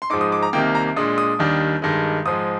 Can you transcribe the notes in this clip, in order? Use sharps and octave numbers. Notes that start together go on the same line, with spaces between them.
C6
G#2 F3 G#3 D#4 D6
D#6
D6
A#5
C2 C3 D#3 A#3 G5
A#5
A#2 G#3 D4 D#6
D#6
D#2 D#3 G3 D4
G2 D#3 G#3
G#2 F3 G#3 D#6